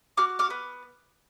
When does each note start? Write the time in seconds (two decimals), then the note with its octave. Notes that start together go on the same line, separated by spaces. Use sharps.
0.17 F#4 D6 F6
0.39 D6 F6
0.50 B3